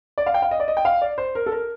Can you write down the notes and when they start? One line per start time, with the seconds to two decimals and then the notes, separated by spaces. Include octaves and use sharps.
0.18 D5
0.27 F5
0.34 G5
0.42 F5
0.51 D#5
0.60 D5
0.68 D#5
0.77 G5
0.85 F5
1.02 D5
1.18 C5
1.35 A#4
1.46 A4
1.52 A#4